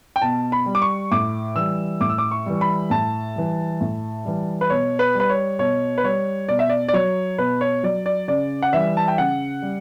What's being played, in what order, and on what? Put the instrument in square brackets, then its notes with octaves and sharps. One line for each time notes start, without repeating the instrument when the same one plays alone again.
[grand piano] G5
B2 A5
B5
G3
D6
C#6
A2 D6
E3 G3 E6
A2 D6
E6
D6
C#6
E3 G3
B5
A2 A5
E3 G3
A2
E3 G3
B4
B2 C#5
B4
G3 B4
C#5
B2 C#5
B4
G3 C#5
B2 D5
E5
D5
D5
F#3 C#5
B2 B4
C#5
F#3 D5
D5
C#3 D5
F#5
E3 G3 E5
A5
G5
C#3 F#5
G3